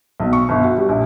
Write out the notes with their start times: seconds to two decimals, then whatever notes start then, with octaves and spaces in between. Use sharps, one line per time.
0.20 B1
0.33 C#6
0.49 G1
0.63 F#4
0.77 G3
0.89 A#1